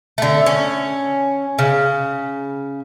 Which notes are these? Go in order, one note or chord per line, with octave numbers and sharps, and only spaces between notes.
D3 A3
C#4
C#3